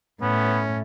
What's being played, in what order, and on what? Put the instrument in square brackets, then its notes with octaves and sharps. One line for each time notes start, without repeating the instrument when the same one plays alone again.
[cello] A2 [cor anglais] B3 [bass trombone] C#4